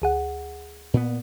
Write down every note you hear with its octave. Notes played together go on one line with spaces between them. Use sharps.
D2 G#4 F#5
A#2 B3